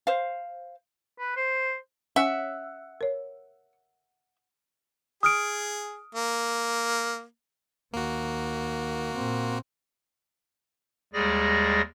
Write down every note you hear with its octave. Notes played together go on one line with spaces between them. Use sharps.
C5 F5
B4
C5
C#4 E5 F#5
A#4 C#5
G#4 D#6 F6 D7
A#3
D#2 D#3 A#3 F#4
A#2 C4
D#2 G3 G#3 G#4 D5 A#6